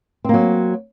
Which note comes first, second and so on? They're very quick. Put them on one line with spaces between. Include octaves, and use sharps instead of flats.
C4 A#3 F#3